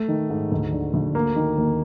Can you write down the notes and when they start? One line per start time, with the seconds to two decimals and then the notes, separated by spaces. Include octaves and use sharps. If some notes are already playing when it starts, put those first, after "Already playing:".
Already playing: A3
0.08 D#3
0.30 G#2
0.52 D2
0.73 D3
0.94 D2
1.15 A#3
1.36 D#3
1.58 D#2